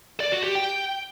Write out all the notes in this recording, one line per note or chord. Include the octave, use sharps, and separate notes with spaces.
D5
F#4
G4
G5